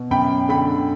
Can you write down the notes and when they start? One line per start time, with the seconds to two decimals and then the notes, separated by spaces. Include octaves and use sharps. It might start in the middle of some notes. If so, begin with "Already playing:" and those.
Already playing: B2
0.11 F#2 G5 B5
0.49 D3 G5 B5